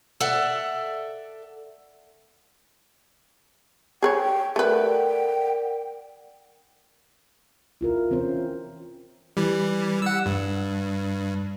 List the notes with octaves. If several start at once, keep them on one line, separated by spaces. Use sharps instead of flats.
A4 D5 E5 F#5
G#4 B4 C#5 G5
A3 A#4 B4 D5 F#5 G5
E4 F4 A#4
E3 C4 C#4 C5
E3 G3
F#5 E6
G2